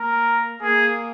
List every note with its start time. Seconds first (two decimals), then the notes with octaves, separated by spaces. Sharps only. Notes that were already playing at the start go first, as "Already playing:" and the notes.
Already playing: A#3 A#4
0.62 A#3 G#4